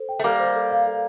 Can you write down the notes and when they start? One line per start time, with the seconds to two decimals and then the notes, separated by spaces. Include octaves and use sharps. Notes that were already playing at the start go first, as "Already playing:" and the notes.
Already playing: A4 C5
0.09 G5
0.19 A3
0.24 G3 A#3 D6
0.40 C5
0.55 A4
0.71 F5
0.87 A4